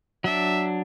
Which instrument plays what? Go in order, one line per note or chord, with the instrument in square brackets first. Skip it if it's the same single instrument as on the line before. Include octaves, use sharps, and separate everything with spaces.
[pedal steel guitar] F#3 D4 [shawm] E5